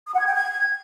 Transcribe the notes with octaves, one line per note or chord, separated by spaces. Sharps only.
D#6
F#5
G#6
G5
G#6